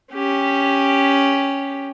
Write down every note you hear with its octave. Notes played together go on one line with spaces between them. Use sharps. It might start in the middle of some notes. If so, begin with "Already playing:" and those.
C#4 G4